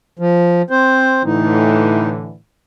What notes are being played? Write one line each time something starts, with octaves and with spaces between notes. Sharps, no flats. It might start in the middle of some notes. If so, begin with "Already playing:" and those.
F3
C4 C5
A2 D3 E3 D#4